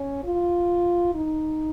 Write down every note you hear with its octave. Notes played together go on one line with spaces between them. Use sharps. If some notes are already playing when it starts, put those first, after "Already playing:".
Already playing: C#4
F4
D#4